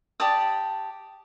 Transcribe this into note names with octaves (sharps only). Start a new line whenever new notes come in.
G4 D5 A5 D#6